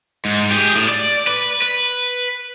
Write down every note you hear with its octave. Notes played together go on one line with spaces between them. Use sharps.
G#2
G4 G#4
A2
D5
B4
B4